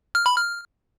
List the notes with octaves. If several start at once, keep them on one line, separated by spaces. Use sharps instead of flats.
F6
B5
F6